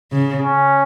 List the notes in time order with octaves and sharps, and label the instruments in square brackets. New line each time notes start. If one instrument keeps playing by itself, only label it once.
[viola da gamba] C#3
[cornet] C#4